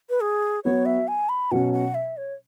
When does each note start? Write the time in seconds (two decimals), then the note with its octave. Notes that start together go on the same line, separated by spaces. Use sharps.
0.10 B4
0.21 G#4
0.64 F#3 B3 F#4 C#5
0.86 E5
1.08 G#5
1.29 B5
1.51 B2 F#3 C#4 F#5
1.73 F#5
1.95 E5
2.17 C#5